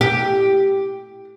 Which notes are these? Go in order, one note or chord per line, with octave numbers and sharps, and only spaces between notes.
G4